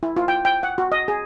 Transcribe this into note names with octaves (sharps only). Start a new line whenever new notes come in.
E4
F4
G5
G5
F#5
F#4
D#5
G#4